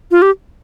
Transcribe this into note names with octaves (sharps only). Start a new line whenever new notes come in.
F4
G4